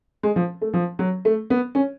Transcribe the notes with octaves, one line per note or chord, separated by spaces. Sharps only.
G#3
F3
A3
F3
F#3
A3
B3
C#4